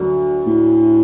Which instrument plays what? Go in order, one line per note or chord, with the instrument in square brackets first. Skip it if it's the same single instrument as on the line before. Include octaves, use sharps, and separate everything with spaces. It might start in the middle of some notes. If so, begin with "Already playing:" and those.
Already playing: [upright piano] D2 D3 F#3
[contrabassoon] A2